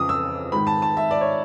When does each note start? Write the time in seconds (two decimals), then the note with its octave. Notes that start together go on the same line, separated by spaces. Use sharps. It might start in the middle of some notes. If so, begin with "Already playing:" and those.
Already playing: F2 C#3 E3 D6 D#6
0.09 E6
0.52 G#2 D#3 B5
0.67 A5
0.82 A5
0.97 E5
1.11 D5
1.21 C#5